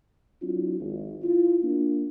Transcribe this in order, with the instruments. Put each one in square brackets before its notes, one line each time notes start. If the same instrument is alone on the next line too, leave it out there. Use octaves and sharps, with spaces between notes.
[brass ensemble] F#3 C4 D4 E4 F4
G#1
E4 F4
A#3 D4